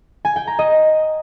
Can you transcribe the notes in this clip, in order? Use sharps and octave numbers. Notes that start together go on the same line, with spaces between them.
G#5
G5
A#5
D#5